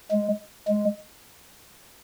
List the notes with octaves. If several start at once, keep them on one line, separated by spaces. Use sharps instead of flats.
G#3
G#3